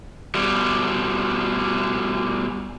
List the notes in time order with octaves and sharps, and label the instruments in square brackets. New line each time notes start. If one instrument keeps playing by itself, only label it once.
[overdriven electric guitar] B2 G3